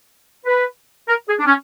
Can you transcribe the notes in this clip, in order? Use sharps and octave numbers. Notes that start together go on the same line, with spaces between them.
B4
A#4
G#4
D4
C#4